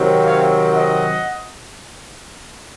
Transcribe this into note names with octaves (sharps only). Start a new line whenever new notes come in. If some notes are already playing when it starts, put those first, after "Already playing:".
Already playing: C3 D#3 F#3 C4
C#5 F5
D#5 F#5